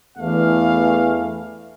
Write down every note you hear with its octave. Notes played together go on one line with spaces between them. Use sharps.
E2 E3 A3 D4 F5